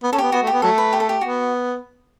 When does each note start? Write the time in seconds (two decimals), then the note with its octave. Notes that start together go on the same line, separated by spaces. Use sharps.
0.03 B3
0.13 C#4 A4
0.18 B3 G4
0.32 B3 F#4
0.43 A3
0.47 G4
0.53 B3
0.62 F#3 A3 A4
0.78 B4
0.93 G4
1.00 A4
1.09 G4
1.21 B3 F#4